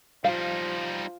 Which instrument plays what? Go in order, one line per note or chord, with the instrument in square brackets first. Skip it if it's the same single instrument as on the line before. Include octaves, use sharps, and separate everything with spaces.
[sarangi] F3 [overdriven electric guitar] G3 D#4 [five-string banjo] F5